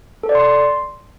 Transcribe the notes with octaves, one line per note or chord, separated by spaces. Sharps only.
A4
D5
C6